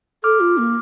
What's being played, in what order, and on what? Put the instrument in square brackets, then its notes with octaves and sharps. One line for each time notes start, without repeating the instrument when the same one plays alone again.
[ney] A4 [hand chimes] D6 F6
[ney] F4
A#3